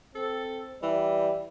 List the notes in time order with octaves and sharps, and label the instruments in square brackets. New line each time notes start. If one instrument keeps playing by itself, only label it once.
[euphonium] C4 [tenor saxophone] A4
[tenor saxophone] E3 [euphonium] G3